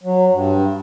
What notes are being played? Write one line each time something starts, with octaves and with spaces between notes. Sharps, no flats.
F#3
G2